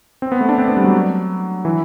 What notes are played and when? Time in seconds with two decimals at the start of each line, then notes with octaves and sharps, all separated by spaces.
0.22 C4
0.32 B3
0.41 A3
0.49 D4
0.58 C4
0.68 B3
0.77 G3
0.85 F#3
1.65 E3